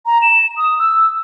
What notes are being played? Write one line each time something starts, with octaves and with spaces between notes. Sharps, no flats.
A#5
E7
D#6
E6